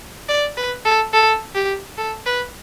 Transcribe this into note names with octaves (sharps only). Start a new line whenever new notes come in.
D5
B4
A4
A4
G4
A4
B4